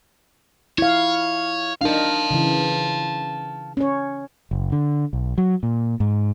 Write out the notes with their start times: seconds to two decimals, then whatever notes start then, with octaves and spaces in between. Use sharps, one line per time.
0.78 E4 C#5 F5
1.81 D4 D#4 A#4 F5 A5
2.31 C#3 E3
3.77 C#4 C#5
4.51 F#1
4.72 D3
5.13 B1
5.38 F#3
5.63 A#2
6.00 G#2